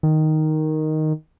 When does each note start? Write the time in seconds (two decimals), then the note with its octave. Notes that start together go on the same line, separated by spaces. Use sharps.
0.03 D#3